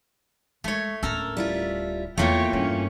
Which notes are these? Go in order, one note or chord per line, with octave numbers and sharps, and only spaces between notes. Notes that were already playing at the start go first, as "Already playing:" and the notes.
G#3 A3 C#5
D1 C#4 A4 A#4 A#5
G3 E4 F4
E2 E3 A3 A#3 F4 C#5 F5 G5
G2 C#4